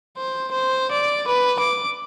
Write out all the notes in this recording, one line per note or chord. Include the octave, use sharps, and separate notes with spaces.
C5
C5
D5
B4
D6